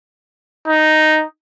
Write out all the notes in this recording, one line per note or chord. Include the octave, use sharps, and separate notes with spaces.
D#4